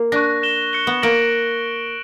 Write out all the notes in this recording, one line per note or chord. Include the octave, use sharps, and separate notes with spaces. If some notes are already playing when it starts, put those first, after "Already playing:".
Already playing: A#3
D4 C#6 F#6 A#6
A#6 E7 G7
F#6 C#7 G7
B3
A#3 A#6 D7 F#7